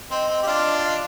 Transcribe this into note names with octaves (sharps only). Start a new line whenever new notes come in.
C4 D#5
C4
G4
D4 F4
D#5